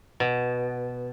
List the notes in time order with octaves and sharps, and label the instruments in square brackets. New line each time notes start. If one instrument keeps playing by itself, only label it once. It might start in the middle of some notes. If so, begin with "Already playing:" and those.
[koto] B2